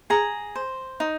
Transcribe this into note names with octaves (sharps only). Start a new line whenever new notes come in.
G#4 A#5
C5
D#4